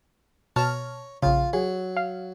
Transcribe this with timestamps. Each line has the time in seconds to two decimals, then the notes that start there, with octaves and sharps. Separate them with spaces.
0.56 B2 C#5 A5 A#5 F6
1.23 A#1 C#3 F4
1.53 F#3 G#4
1.97 F5